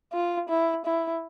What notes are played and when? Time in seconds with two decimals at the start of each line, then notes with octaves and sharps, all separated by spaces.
0.13 F4
0.49 E4
0.85 E4